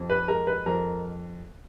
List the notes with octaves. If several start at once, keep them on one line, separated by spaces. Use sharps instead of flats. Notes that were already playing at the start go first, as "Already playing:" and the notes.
Already playing: F2
B4
G#3 A#4
B4
F2 A#4